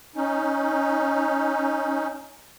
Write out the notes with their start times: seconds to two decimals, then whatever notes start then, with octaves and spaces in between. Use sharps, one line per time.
0.15 C#4 D#4